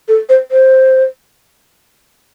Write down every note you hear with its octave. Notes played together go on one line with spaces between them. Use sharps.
A4
C5
C5